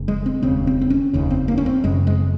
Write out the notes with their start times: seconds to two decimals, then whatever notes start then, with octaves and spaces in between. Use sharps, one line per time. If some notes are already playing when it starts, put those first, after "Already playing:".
Already playing: F1 C#3
0.08 G#3
0.26 C4
0.42 F1 D#2 C#3 C4
0.67 C4
0.81 C4
0.90 C#4
1.13 F1 D#2 C#3
1.30 C4
1.48 A#3
1.58 C#4
1.66 C4
1.84 F#1 F#2 C#3 G#3
2.07 G#3